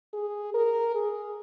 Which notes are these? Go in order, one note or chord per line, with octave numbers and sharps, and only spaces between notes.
G#4
A#4
G#4